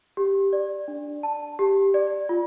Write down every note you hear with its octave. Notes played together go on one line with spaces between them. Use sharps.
G4
D5
D4
A5
G4
D5
F4